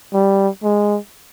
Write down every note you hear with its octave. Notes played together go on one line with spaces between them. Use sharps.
G3
G#3